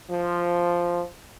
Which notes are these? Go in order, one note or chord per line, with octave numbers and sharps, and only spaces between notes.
F3